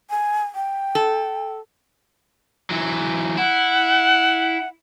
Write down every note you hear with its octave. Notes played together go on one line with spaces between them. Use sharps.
G#5
G5
A4
E3 F#3
E4 F#5